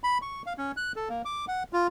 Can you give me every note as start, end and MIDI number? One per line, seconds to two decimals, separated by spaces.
0.04 0.18 83
0.22 0.42 85
0.46 0.53 77
0.58 0.72 61
0.77 0.92 90
0.96 1.09 69
1.09 1.22 58
1.25 1.45 86
1.48 1.63 78
1.73 1.87 65